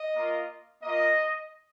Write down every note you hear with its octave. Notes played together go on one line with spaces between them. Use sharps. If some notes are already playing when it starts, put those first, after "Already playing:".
Already playing: D#5
A#3 F4
A#3 F4 D#5